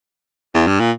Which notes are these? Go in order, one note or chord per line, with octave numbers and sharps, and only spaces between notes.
E2
G2
A#2